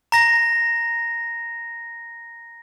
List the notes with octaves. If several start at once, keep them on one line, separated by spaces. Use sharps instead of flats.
A#5 A#6